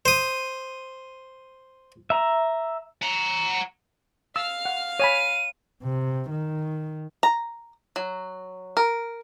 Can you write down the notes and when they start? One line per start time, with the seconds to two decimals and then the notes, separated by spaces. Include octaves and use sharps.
0.05 C5 D#6
2.10 E5 A#5
3.02 F#5 A#5
4.36 F5 E6 F6
4.65 F#5
4.99 C#5 G#5 B5 D#7
5.83 C3
6.30 D#3
7.23 A#5
7.96 F#3
8.77 A#4